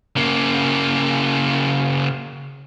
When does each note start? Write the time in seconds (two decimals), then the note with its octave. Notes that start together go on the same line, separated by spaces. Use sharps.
0.17 C#3 A#3